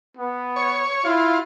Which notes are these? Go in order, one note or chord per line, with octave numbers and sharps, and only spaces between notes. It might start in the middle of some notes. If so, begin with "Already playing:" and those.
B3
C#5
E4 F4